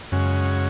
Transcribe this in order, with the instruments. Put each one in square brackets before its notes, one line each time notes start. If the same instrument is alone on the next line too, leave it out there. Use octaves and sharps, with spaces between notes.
[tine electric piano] F#2 [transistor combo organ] C#3 G#3 C#4 F#4